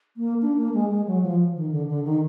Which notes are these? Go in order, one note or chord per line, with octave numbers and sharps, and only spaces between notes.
A#3
D4
A#3
G#3
G#3
F#3
F3
D#3
D3
D3
D#3